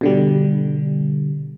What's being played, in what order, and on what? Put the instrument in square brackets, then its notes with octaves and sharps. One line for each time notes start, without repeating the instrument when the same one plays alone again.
[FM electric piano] B2 D3 G3